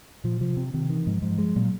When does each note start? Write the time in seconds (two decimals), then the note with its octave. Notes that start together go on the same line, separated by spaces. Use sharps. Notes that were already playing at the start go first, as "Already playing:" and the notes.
0.24 A#2 F3
0.40 C3 F3
0.57 C3
0.74 C3 D#3
0.90 D#3 E3
1.06 G#2 F3
1.22 G#2 F3
1.35 E3
1.38 F3 G#3
1.55 A#2 F#3